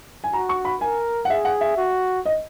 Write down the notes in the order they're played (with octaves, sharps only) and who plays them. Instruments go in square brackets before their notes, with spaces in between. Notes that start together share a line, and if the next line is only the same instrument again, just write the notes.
[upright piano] G#5
[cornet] F#4 [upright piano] A#5
[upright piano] C#6
B5
[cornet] A#4 [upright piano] G#5
[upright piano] F#5
[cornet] G#4 [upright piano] E5
[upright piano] F#5
E5
[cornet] F#4
[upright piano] D#5